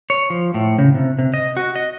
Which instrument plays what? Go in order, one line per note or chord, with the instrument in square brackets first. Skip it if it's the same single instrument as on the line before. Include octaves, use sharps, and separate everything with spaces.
[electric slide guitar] C#5
F3
A2
C#3
C3
C3
D#5
F#4
D#5